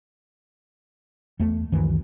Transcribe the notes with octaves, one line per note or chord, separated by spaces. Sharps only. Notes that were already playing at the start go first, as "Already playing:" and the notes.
E2 A3
C#2 F#2 D#3 E3